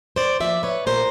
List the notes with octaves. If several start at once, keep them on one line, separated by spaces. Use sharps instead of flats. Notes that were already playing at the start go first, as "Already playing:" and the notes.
C5 D5
F3 A#3 D5 E5
B4 C#5
A#2 A#4 C5